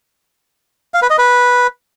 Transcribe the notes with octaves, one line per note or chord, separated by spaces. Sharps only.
F5
B4
D#5
B4